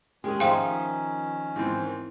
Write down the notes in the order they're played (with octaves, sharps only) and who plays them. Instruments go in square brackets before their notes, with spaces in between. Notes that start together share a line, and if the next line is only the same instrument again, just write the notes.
[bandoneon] D#3 C#4 [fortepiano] G#3 [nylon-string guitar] G4 G#4
[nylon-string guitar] F3 D#4 [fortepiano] E5 [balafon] F5 G5 C6
[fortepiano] G#2 E3 C4